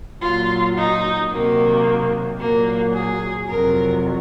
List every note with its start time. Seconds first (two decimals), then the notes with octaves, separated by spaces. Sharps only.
0.22 A#2 F#3 F4
0.77 D#4
1.31 C3 D#3 F#3 A#3
2.39 A#2 F#3 A#3
2.93 G#4
3.48 F2 C3 F#3 A#4